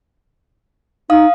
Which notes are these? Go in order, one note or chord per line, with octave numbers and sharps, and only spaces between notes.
D#4 F5 D#6